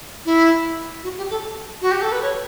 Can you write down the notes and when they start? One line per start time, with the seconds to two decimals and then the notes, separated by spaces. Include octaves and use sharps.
0.25 E4
1.04 F#4
1.17 G4
1.30 A4
1.82 F#4
1.91 G4
2.01 A4
2.12 B4
2.22 C#5